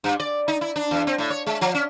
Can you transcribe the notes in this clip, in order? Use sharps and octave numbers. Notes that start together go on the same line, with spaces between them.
G2
D5
D#4
E4
D4
E2
C4
A2
C#5
G#3
F3
C#4